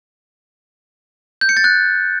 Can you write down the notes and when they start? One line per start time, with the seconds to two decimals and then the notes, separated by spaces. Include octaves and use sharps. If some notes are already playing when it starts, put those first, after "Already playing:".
1.41 G6
1.49 C#7
1.57 A6
1.64 F#6